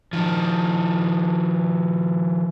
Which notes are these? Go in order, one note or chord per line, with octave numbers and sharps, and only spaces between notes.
D#3 F3